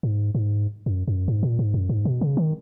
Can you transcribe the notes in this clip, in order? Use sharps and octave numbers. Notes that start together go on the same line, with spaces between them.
G#2
G#2
F#2
F#2
G#2
A#2
G#2
F#2
G#2
B2
C#3
D#3